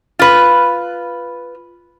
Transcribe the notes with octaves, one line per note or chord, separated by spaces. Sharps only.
F4 B4